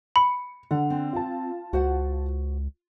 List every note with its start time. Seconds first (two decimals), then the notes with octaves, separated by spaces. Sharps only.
0.16 B5 C#7
0.71 D3 F#5
0.90 C4
1.13 F4 A5
1.73 C#2 F#4 C5 F#5